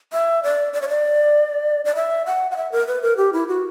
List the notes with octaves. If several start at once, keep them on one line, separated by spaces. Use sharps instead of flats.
E5
D5
D5
C#5
D5
D5
E5
F#5
F#5
E5
A#4
B4
A#4
G4
E4
F#4